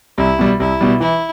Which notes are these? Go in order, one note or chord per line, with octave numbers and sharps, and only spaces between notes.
C2 E4
B2 G3
C2 E4
B2 G3
E3 E4